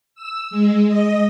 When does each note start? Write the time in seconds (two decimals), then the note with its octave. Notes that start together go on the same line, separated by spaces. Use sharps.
0.15 E6
0.51 G#3
0.88 D#5